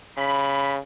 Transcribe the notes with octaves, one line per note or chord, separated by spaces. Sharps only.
C#3 B5